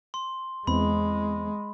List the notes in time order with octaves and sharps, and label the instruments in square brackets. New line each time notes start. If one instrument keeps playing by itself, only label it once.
[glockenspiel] C6
[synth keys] E2 C4 [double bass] G#3 [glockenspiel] B5